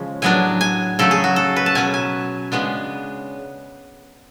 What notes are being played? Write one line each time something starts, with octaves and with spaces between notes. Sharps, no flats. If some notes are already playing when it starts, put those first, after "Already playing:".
Already playing: C#3 F3 G#3 C#4
A2 F#3 B3 D4 G#5
G#5
C#3 F#3 A3 A4
G#4
F#4
A4
B4
A5
B2 F#3 C#4 G#5
G#5
C#3 G#3 B3 D4